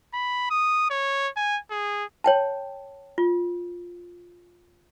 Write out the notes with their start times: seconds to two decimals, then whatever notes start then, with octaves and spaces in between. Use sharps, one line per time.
0.14 B5
0.50 D#6
0.90 C#5
1.37 G#5
1.71 G#4
2.24 C#5 G5 A5
3.18 F4